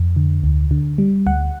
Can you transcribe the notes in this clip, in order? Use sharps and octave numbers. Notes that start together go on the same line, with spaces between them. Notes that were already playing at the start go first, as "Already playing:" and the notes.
Already playing: F2
D3
D2
D3
G3
D2 F#5